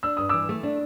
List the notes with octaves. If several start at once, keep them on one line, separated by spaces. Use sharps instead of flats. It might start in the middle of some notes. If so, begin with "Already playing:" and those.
D4 E6
G2 D#6
E3 D6 E6
A3
D4